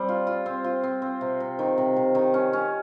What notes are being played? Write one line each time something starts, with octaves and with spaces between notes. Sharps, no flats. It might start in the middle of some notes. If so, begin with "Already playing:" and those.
Already playing: G3 C4
F4
F4
C4
F4
C4
C4
C3
C3
D#3
C3
C3
D#3
C#4
C#4